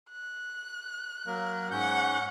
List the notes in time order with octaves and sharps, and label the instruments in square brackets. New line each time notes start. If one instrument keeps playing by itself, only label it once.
[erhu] F#6
[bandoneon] F#3 A#3 A#4
[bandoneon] G#2 C#4 G6 [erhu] F#5